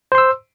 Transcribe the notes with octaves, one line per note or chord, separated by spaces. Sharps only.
C5 C6 E6